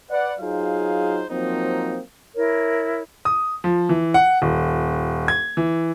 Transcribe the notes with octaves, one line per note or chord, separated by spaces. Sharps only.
B4 D5 F#5
F#3 D#4 F4 G#4 C5 F5
F3 F#3 A#3 C4 D#4
E4 A#4 C#5
D#6
F3
E3
F#5
D#1
G#6
E3